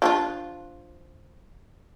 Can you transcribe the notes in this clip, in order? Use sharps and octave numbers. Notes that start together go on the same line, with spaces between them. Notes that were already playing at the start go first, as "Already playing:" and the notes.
F3 D4 F4